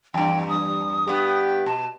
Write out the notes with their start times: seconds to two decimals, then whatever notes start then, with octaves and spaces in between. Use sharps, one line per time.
0.14 E2 G2 G5
0.49 G3 D#6
1.08 G2 B3 G4
1.66 B2 A5